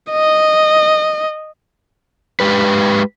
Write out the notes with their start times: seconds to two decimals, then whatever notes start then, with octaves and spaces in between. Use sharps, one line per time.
0.11 D#5
2.40 G#3 G4 B4